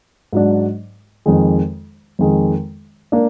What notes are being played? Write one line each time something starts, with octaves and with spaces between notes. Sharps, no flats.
G#2 F#3 D4
F2 D#3 G#3
F2 D#3 G#3
A#3 D4